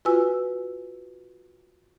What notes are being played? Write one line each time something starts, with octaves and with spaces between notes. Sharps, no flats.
F4 F#4 B4 G#5 E6